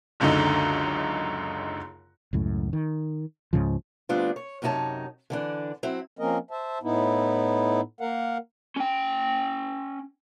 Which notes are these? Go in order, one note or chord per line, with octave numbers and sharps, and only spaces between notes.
F#1 C#2 F#2 D3 D#4
C#2 F#2 A2
D#3
C#2 G#2 C#3 F3
D2 G3 B3 C4 D4 F4
C#5
F#2 C3 D#4 F#4 C#5 A5
D3 E3 D4
F#3 C4 E4
F3 A#3 C4 C#4 A#4 D#5
C5 E5 A5
A2 B3 D#4 E4
A#3 A#4 F5 F#5
C#4 G5